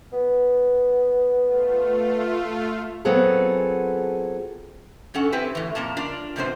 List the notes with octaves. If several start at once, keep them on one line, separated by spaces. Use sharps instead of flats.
B3
A3 F4
F#3 B3 C4 F4 G#4 A4
G2 C#4 A4 F#5
C4 E4 G4 B4
A2 E3
F2 A#2 A#3 A5
D4 F4 A#4 D5
G#2 C3 F3 B3 C5